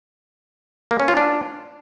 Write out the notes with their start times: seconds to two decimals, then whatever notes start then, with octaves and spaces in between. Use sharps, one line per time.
0.91 A#3
1.00 C#4
1.08 F4
1.17 D4